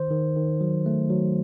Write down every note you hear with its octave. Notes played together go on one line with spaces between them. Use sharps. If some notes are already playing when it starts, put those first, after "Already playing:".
Already playing: D#3 C5
D#3
D#3
F#3
A3
F#3